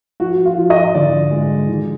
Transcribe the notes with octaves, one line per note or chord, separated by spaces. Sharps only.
F3 F#4
F4
F3
D#5
D3 D5
G#3
D3